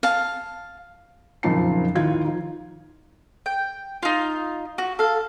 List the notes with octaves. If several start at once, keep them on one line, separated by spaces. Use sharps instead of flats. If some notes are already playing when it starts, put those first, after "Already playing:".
F5 A5
F#1 F2 A#2 D#4 A5 C7
D#2 A2 F4 G#6
F3 D#4
G5
D#4 F4
F#4
A4 F5